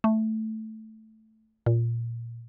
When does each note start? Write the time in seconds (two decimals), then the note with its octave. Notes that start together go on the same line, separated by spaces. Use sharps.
0.04 A3
1.66 A#2